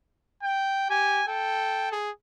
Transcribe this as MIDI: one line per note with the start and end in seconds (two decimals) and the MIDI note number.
0.43 0.85 79
0.90 1.22 67
0.90 1.26 80
1.28 1.97 69
1.28 1.89 79
1.92 2.11 68